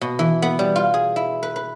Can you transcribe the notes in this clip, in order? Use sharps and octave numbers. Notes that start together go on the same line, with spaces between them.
B2
E3
B3
G3
F4
G#4
E4
B4
B4